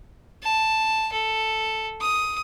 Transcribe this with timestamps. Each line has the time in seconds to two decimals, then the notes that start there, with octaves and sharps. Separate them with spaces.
0.43 A5
1.13 A4
2.01 D#6